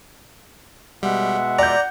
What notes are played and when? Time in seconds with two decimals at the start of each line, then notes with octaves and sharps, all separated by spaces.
1.03 B2 G3 G#3 E5 F#5
1.58 D5 A#5 G6